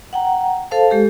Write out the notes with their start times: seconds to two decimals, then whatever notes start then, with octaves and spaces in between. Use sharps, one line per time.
0.13 F#5 G5 A#5
0.71 A4 C5 F5 A5
0.90 G#3 G4 A4